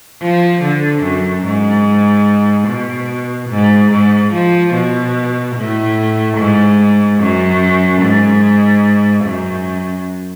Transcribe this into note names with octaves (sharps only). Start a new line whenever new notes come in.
F3
D3
F#2
G#2
B2
G#2
G#2
F3
B2
A2
G#2
F#2
G#2
F#2